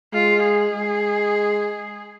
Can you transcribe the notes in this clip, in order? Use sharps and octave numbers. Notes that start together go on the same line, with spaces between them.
G#3 F4
G#4
G#3